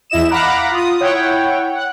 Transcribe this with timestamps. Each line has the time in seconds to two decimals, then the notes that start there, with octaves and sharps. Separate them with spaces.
0.10 E2 E4 D#5 E7
0.30 F5 F#5 A#5 B5 D6 F#6
0.70 F4 D#6
1.00 E4 C#5 F#5 G5
1.74 F#5